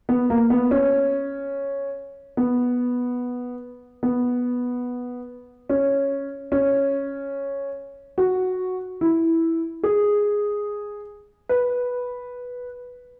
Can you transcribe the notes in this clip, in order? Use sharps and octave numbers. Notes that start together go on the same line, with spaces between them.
B3
A#3
B3
C#4
B3
B3
C#4
C#4
F#4
E4
G#4
B4